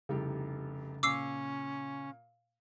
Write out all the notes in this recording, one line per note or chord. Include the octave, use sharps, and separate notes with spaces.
F1 C2 C#3 G4
A#2 C#4 D6 E6 C7